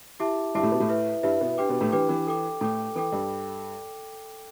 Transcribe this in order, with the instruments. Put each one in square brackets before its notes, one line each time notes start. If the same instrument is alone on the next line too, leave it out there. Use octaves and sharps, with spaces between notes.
[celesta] E4 G4 E5 A5 D6
[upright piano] G2 G3 [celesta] E4 G4 E5 A5 D6
[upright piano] A2 A3
B2 B3
A2 A3
[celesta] E4 B4 E5
[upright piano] G2 G3 [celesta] E4 B4 E5
[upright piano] B2 B3
[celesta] D4 G4 B4 G5 D6
[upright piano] B2 B3
A2 A3
[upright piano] E3 [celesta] D4 G4 B4 G5 D6
[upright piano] E3
[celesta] A4 G5 D6
[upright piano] A2 A3 [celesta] A4 G5 D6
[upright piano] E3 [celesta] A4 G5 D6
[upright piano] G2 G3